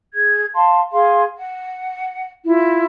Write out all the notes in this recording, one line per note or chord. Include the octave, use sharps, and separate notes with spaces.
G#4 G#6
F5 A5 C6
G#4 F5 C6
F#5
E4 F4